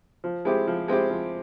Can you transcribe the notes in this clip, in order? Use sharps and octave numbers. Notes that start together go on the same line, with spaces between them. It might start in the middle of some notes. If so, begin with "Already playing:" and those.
F3
G#3 C4 E4 G4
F3
G#3 C4 E4 G4
F3